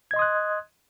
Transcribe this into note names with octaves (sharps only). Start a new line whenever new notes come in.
D#5 C6 D#6 F#6 G#6